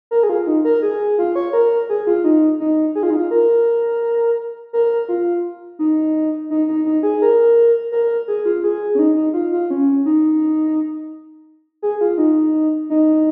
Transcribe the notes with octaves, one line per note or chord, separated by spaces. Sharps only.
A#4
G#4
F4
D#4
A#4
G#4
F4
C#5
A#4
G#4
F4
D#4
D#4
G#4
F4
D#4
F4
A#4
A#4
F4
D#4
D#4
D#4
D#4
G#4
A#4
A#4
G#4
F4
G#4
C#4
D#4
D#4
F4
F4
C#4
D#4
G#4
F4
D#4
D#4